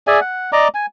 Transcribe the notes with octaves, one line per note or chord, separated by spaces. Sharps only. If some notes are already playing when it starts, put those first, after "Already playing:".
G#4 D5 E5 G#5
F#5
D5 D#5 A#5 D6
G#5